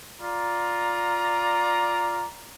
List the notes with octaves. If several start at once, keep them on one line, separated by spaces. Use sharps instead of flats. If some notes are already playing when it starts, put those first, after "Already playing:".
F4 D5 A#5